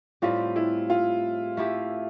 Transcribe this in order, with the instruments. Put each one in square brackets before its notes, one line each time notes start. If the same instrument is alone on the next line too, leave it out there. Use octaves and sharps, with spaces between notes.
[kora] A2 G3 C4 G4 [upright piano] F4
[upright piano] E4
F4
[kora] A3 E4 G4